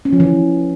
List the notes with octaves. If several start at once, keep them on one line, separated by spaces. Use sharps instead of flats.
C#4
F3
E3